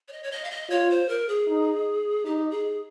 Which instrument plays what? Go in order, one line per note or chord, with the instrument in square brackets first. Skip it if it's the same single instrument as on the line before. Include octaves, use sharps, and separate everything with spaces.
[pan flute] C#5
D#5
C#5
D#5
F5
D#5
[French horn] F4 [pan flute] C#5
[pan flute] C5
A#4
G#4
[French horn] D#4
[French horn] D#4 [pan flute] G4
[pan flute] G#4